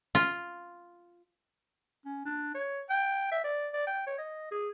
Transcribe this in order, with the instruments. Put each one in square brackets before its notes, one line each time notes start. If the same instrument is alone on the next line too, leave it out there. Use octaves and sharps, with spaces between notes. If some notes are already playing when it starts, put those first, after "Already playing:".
[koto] F4
[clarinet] C#4
D4
C#5
G5
E5
D5
D5
G5
C#5
D#5
G#4